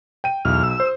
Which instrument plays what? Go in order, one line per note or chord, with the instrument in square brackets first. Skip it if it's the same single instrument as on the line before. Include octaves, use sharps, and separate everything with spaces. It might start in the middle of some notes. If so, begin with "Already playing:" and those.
[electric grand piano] G5 D#7
[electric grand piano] B1 [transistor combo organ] E2 F6
[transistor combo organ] E6
[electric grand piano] C5